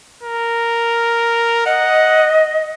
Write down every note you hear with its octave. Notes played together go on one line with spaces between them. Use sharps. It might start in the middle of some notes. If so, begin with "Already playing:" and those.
A#4
D#5 F#5